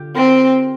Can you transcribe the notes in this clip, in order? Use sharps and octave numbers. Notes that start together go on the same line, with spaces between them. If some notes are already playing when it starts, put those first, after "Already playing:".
Already playing: D3 F4 G4
C4 A#4